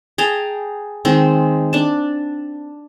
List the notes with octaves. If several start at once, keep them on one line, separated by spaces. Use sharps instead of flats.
G#4 G5 A5 A#5
D#3 G#3 C4
D4 A5